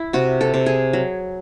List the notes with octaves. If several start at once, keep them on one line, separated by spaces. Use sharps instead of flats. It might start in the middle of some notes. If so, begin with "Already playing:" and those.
Already playing: E4
C3 F#4
A4
C3
G#4
F#3